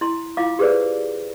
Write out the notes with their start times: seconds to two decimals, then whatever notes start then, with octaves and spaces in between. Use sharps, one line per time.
0.01 E4 C6
0.37 E4 F4 F5 D6
0.59 G4 G#4 B4 C5 D5